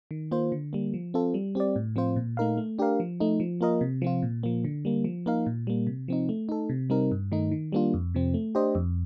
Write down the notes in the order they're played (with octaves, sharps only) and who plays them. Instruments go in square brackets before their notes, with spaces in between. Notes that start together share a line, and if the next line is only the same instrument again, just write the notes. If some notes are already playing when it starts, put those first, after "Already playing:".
[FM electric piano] D#3
A#3 F4 C5
D3
G3 A#3
F3
C4 F4 A4
G3
C4 G4 D5
A2
F3 C4 F4 C5
A#2
A3 D#4 A#4 F5
A3
D4 G4 A#4 F5
F3
A3 D#4
F3
A#3 F4 A#4 D#5
C3
F3 C4 F4
A#2
F3 A#3
D3
G3 A#3
F3
A#3 D#4 A#4 F5
A#2
G3 A#3
C3
F3 C4 D#4
A3
D#4 A4
C3
G3 C4 D#4 A#4
G2
D#3 A3 D#4
D#3
G3 A#3 D4 F4
F2
C3 F3 C4
A3
D4 G4 C5 D#5
F2